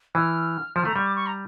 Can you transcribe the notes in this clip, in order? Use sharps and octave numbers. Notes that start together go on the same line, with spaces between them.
E3 F6
F3 F6
A3 A#5
G3 C#6
D6
C#6
A#5